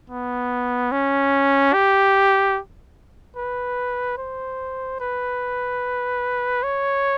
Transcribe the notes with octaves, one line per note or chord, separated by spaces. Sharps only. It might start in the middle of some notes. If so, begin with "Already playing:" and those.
B3
C#4
G4
B4
C5
B4
C#5